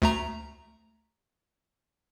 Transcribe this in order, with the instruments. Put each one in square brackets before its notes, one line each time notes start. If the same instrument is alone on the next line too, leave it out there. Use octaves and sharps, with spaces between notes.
[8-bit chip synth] D2 A3 A#5